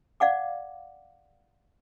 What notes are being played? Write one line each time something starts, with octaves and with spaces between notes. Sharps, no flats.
D5 F5 F#5 D6